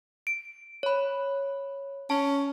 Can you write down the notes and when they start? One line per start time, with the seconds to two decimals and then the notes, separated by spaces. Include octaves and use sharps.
0.27 D7
0.83 C#5 B5
2.10 C#4 A5